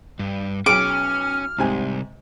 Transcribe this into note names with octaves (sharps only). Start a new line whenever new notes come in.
G2
B1 C#4 G#4 D6 F6
C2 G#2 C3 G#5